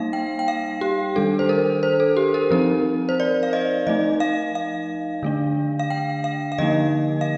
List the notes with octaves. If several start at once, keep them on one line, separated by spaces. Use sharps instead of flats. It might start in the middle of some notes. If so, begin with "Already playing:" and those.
Already playing: G3 A#3 D#4 F5
G5
G5
F5
G4
D#3 G3 D4 A4
C5
A#4
C5
A4
G4
A#4
F3 C4 D#4 A#4
C5
D5
F5
D#5
F3 A3 D#4 D#5
F5
F5
D3 A3 D4
F5
G5
F5
F5
D3 F3 A#3 D#4 D#5
F5